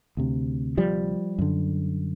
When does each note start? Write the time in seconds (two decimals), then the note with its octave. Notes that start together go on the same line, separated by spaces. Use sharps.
0.17 D2 C3
0.77 F3 G3
1.39 F#2 D3